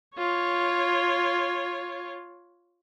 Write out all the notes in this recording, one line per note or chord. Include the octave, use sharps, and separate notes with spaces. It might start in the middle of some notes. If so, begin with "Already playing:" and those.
F4 C#5